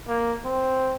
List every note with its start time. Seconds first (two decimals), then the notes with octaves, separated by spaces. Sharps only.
0.08 A#3
0.45 C4